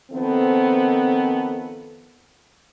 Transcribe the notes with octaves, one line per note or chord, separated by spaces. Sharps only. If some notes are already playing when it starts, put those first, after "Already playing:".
D#3 F3 B3 C4 A4